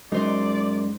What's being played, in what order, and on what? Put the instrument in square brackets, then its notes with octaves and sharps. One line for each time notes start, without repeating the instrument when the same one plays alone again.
[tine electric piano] F#2 [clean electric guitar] G#3 [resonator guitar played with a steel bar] D#4 C5 [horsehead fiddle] D5